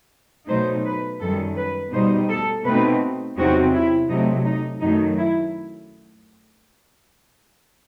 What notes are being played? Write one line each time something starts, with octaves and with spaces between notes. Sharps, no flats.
B2 F#3 A3 D#4 C5
B4
F#2 D#3 G3 A4
B4
B2 G3 D#4 C5
A4
B2 A3 C4 D#4 B4
E2 C3 F#3 C4 D#4 F#4
E4
C3 F#3 A3 D#4
D#4
F#2 D#3 F#3 A3 D#4
E4